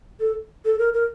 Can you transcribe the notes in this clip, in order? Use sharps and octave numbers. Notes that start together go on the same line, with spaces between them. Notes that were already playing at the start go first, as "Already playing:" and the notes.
A4
A4
A#4
A#4